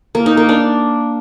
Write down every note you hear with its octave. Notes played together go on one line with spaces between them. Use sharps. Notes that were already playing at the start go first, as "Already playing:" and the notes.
A#3
D#4
A#3
D4